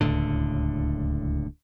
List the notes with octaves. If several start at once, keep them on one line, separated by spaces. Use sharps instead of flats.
D1 C#2 A2 D3